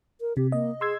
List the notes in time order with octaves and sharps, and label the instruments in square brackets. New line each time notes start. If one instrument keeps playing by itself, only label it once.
[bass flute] A#4
[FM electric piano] C3 [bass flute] G4
[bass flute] A#3 [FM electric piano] D#5
[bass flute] G#4 [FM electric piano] C6 E6 G#6